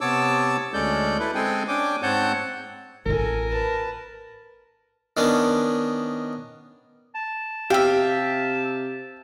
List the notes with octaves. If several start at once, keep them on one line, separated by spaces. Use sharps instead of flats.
C3 B3 C#5 A5 D6 E6
D2 G#3 C#4 A4 D5 G6
E4 A4 B4
G#3 C4 G#4 A4 G5 G#5
C#4 D4 G5 G#5 D6
G#2 C4 C#5 F#5 A5 G6
A1 F4 A4 A#4 G#5
B4 A5
D#3 B3 C#4 D4
A5
C3 G4 E5 F5 G5